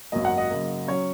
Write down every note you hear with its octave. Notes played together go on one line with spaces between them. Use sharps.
G#1 F#2 F#3 A#3 D#5
F#5
D#5
F#2 C#3 A#3
F#3 C#4 C#5